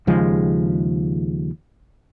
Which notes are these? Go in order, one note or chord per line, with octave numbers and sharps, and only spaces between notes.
D#2 C#3 F3 G#3